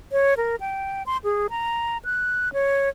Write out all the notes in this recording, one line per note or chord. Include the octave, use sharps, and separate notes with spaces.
C#5
A#4
G5
C6
G#4
A#5
F#6
C#5